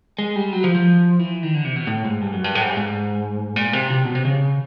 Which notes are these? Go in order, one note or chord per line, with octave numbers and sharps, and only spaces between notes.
G#3
G3
F#3
F3
F3
E3
D#3
D3
C3
B2
A2
G#2
G2
F#2
G2
A2
G#2
G2
G#2
A#2
C3
C3
B2
C3
C#3